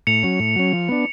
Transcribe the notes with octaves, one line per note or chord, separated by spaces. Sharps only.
A2 C#7 F7
F#3 C#4
A2
F#3 C#4
F3
B3 D4